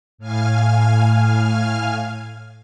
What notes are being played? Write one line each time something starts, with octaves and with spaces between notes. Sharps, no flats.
A2 F5 G#5 F6